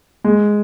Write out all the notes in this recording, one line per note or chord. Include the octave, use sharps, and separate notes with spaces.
G#3